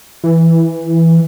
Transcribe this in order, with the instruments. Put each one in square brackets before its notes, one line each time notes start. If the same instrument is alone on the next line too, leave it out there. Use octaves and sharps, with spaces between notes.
[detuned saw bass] E3